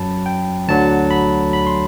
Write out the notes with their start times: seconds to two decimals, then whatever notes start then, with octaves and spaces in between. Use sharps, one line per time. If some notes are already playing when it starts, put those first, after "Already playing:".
Already playing: F#2 F#3 A5 B5
0.26 G5
0.68 D2 D3 F#3 A5
1.11 B5
1.53 B5
1.67 C6